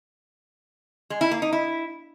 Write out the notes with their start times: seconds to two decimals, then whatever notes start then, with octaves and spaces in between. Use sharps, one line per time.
1.10 G#3
1.21 E4
1.31 A#3
1.42 D#4
1.53 E4